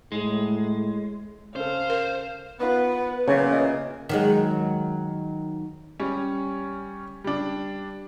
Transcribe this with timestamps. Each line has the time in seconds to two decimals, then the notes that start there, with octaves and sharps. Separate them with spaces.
0.12 A2 G#3
1.56 C#3 A4 C5 F5
1.90 A#4
2.60 D#3 B3 F4 B4
3.28 A#2 C#3 E3 F#3 B3 C#5
3.52 G#4 D#5
4.09 D#3 F#3 G#3
6.00 G3 C#4
7.24 G3 D4